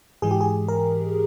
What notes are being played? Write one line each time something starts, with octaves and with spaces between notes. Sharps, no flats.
G#2 E3 G#3 G#4
G4
G#4
A#4